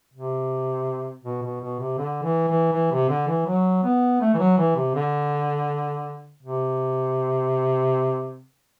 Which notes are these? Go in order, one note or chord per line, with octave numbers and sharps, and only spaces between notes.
C3
B2
B2
B2
C3
D3
E3
E3
E3
C3
D3
E3
F#3
B3
A3
E3
F#3
E3
C3
D3
C3